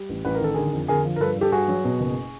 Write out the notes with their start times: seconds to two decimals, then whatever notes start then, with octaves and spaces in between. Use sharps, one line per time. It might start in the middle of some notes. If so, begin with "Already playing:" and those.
Already playing: G3
0.09 A1
0.25 A1 B4
0.35 A#4
0.40 D#3 A4
0.54 D3 G#4 A#4
0.73 F2
0.88 D3 G#4 A#4
1.05 F3
1.16 A#4
1.20 G2 A4 B4
1.36 G2
1.41 G4 A4
1.52 G2 F#4 G#4
1.68 F#3
1.85 B2
2.00 F#1